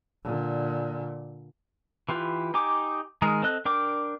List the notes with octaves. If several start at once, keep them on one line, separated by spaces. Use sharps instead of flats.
A#2 D3
E3 F4 G4 B4
D#4 G4 G#5 D6
D#3 G#3 G#4 A#4
C4 A4 D#5 F#6
D4 A#4 G5 D6